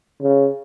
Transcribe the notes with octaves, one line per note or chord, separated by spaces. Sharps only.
C#3